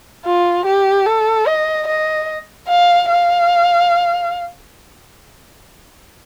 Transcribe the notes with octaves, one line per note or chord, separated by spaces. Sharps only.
F4
G4
A4
D#5
D#5
F5
F5